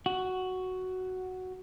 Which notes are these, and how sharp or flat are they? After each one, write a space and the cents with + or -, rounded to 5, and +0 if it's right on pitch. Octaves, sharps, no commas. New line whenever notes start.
F#4 +5